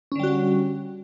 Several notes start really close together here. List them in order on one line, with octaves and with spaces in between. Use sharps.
C#4 D3 G3 F#4